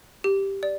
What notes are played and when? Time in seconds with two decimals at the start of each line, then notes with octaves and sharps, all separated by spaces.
0.24 G4
0.63 D5